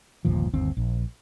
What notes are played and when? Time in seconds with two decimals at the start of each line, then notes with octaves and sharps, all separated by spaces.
0.25 G1 D#2 A#2 F3
0.54 G1 D#2 C4
0.77 A#1